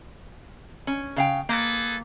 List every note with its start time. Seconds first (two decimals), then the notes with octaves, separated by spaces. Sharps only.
0.87 C#4
1.16 C#3 F5 G5
1.49 A#3 G#4 A4 B4